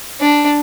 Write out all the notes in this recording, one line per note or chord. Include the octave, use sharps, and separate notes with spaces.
D4